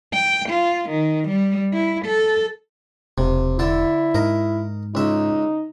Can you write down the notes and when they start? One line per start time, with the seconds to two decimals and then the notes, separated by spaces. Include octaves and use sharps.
0.13 G5
0.50 F4
0.90 D#3
1.29 G3
1.74 E4
2.06 A4
3.18 E1 C3
3.59 D3 E4 A4
4.15 G#2 A#4 D#5
4.95 C#2 D#4 E5